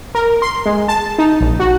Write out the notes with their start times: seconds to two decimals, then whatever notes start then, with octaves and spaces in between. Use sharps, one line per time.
0.15 A#4
0.42 C6
0.66 G#3
0.88 A5
1.19 D#4
1.41 A#1
1.60 F#4